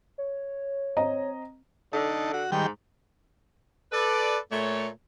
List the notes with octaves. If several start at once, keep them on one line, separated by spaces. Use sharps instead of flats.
C#5
C4 D#5 A#5
D3 D#4 A4
F#4
G#2 D#3 G3 G5
A4 B4 D5
A#2 A3 C#5